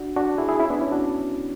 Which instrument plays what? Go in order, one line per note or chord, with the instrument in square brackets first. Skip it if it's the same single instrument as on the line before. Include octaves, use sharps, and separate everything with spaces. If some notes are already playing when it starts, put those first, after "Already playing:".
Already playing: [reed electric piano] D4 F#4
D4 F#4
E4 G#4
E4 G#4
C#4 E4
B3 D4
C#4 E4
D4 F#4